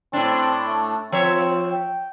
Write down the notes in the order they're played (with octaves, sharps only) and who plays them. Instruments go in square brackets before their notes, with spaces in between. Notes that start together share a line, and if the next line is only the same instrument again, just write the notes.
[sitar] A2 D4 [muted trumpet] C4
[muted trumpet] A3
[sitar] F3 C#5 E5 [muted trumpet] C4
[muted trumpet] G5